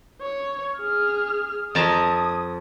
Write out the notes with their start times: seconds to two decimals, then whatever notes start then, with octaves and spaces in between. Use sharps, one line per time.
0.21 C#5
0.78 G#4 F6
1.75 F2 A5 A#5 D#6